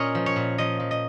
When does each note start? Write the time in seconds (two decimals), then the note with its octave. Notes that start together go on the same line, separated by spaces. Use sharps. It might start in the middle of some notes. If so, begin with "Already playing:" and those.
Already playing: A#2 C#4 A#4 C#5 D#5
0.15 F3
0.26 C#5
0.36 A#2
0.58 F3 D#5
0.80 F3
0.91 D#5